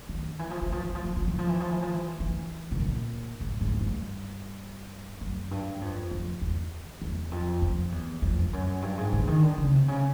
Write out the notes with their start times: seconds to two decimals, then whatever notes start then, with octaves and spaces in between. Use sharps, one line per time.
0.09 D#3
0.39 E3
0.50 F3
0.62 E3
0.72 F3
0.83 E3
0.95 F3
1.05 E3
1.17 F3
1.28 E3
1.39 F3
1.49 E3
1.60 F3
1.71 E3
1.82 F3
1.93 E3
2.20 E3
2.72 B2
2.80 A#2
3.41 G#2
3.61 G#2
3.81 G2
5.21 F#2
5.51 G2
5.81 F2
6.11 F2
6.41 E2
7.02 E2
7.31 F2
7.62 F2
7.92 E2
8.22 F2
8.42 F2
8.53 F#2
8.82 G2
8.98 G#2
9.13 D3
9.27 D#3
9.43 D3
9.58 C#3
9.72 C3
9.88 C#3